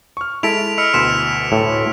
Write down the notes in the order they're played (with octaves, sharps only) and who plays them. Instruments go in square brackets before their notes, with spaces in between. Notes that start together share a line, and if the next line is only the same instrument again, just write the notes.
[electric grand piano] C#6 F6
[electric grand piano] G#3 [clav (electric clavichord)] E4 A4 [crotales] B6 D7 F7
[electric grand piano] D#5 B5 [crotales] E6 F6 C#7
[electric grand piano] D2 B2 C6 [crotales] F6 B6 E7
[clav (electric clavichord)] A2